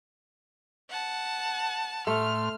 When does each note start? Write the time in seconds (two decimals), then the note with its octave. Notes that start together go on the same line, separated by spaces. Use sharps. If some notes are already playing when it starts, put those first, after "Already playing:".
0.89 F#5 A5
2.07 A2 A3 C6 F6